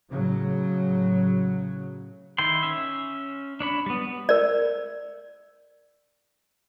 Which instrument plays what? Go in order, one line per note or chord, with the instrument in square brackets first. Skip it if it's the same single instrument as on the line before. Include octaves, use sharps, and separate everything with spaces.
[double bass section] A2 C#3 F#3
[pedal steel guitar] D#3 E4 G5 C6
C#4 E5
D4 C#5 B5
G3 B3
[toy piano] A#4 D5